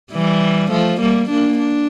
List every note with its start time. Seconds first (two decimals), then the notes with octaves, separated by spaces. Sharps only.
0.13 E3 G3
0.71 F3 A3
1.01 G3 A#3
1.30 A#3 D4
1.59 D4